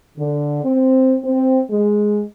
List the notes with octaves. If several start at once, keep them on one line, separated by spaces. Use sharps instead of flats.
D3
C4
C4
G#3